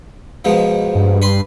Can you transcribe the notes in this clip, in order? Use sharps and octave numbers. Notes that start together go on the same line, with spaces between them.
G#2 B2 F3
G2
B4 C6